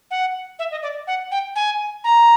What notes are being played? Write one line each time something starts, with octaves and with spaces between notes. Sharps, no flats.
F#5
E5
D#5
D5
F#5
G5
G#5
A#5